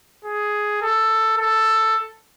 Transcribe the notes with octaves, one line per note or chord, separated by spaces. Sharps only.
G#4
A4
A4